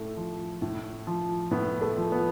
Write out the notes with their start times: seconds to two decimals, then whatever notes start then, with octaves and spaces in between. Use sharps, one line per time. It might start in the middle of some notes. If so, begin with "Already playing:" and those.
Already playing: A2 A3
0.17 F3
0.62 A2
1.07 F3
1.51 A2 B3
1.81 A3
1.97 F3
2.12 B3